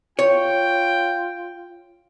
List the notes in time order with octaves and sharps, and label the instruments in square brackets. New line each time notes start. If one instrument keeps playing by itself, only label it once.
[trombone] F4 [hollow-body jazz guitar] C#5 [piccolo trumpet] G5